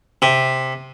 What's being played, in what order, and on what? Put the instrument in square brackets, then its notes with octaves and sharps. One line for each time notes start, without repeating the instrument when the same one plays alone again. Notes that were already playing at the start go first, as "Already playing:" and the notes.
[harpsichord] C3